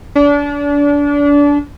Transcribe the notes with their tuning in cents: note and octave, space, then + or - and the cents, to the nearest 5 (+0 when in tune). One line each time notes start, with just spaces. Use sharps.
D4 -30